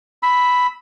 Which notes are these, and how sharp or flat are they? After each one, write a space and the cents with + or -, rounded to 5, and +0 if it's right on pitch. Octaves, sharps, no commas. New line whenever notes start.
B5 +5 E6 -10